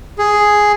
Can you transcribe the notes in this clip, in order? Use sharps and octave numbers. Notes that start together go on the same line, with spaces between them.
G#4